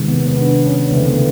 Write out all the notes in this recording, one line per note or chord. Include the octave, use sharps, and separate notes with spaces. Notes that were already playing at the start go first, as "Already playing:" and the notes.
Already playing: C3 D#3 G#3
B3
B3
D4
C#4
C#3 E3 A3 C4
B3